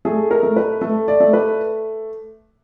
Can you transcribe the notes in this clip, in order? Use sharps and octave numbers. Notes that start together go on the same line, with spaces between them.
A3 G#4
A#4
A3
B4
A3
D5
A3
B4